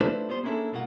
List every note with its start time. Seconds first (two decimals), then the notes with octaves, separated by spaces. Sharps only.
0.01 A3 D4 E4 F4 B4 C5
0.29 G3 B3 C5 C6
0.43 A#3 C#4 D4 E4 G#4 A4
0.72 G2 B2 A#3 F4 F#5